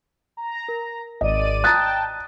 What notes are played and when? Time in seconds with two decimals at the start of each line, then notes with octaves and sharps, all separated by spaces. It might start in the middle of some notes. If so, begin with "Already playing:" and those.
0.37 A#5
0.68 A#4
1.21 G#1 D5 D#5 D#7
1.64 G5 A5 A#5 D#6 F#6 A6